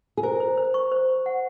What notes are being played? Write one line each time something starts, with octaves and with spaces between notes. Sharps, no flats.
G#4
A#4 C5
C5
C5
C#6
C5
C#6
F#5